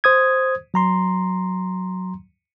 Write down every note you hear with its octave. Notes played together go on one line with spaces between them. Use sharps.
C5 D#6 G#6
F#3 A#5 C6